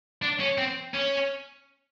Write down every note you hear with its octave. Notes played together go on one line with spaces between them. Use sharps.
D4
C#4
C4
C#4